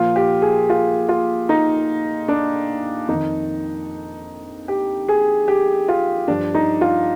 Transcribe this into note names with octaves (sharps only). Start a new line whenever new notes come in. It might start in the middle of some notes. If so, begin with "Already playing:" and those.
Already playing: A#2 F3 F4
G4
G#4
F4
F4
D#4
D4
F2 D#3 D#4
G4
G#4
G4
F4
G2 F3 D4
D#4
F4